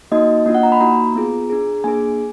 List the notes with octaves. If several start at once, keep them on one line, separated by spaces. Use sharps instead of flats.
A#3 D#4 F#4 D#5
A#3 D4 F4 D#5
F#5
A#5
B5
A#3 D#4 F#4 A#5
B3 F4 G#4
D4 G#4
A#3 D4 G#4 G#5